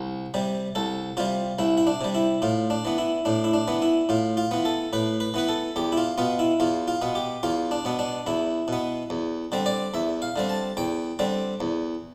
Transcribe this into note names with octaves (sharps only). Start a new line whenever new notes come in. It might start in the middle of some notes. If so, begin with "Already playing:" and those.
Already playing: C2
C3 G3
C2 A4
C3 G3 F4
C2 E4
E4
D4
C3 G3
E4
A2 F4
D4
E3 B3
E4
A2 D4
E4
D4
E3 B3
E4
A2 F4
F4
E3 B3
A4
A2 B4
B4
E3 B3 B4
A4
E2 G4
E4
F4
B2 B3 F4
E4
E2 F4
F4
B2 B3
G4
E2 F4
D4
B2 B3
D4
E2 E4
B2 B3
E2
D3 G3 C4
D5
E2 E5
F5
D3 G3 C4
A5
E2 G5
D3 G3 C4
E2